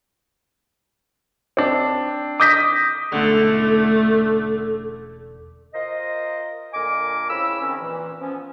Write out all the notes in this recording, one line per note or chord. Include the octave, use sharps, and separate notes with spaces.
C4 D4
D6 D#6 G6 A#6 B6
E1 D3 A3 C#4 A4
F4 A#4 C5 D#5
A#2 D3 A#4 D#5 G#5 D6
C#3 C4 E4 B5 E6
D#3 F3 C4 C#4
A#2 E3
F3 B3 C#4